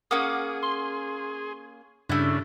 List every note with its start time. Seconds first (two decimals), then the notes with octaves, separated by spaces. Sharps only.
0.11 A#3 C#4 G#4 F#5 D6 D#6
0.63 C6
2.10 G2 C#3 A3 D4 E4